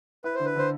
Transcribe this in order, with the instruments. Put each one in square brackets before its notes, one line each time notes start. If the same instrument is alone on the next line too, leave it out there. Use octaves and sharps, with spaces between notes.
[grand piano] E4 [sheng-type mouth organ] B4
[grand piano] D3 [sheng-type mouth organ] C5
[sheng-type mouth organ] B4
[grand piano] D3 [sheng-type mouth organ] C5